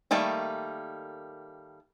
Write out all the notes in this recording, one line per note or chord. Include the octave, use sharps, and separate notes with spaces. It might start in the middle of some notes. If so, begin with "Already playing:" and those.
D#3 G3 A3 A#3 D#4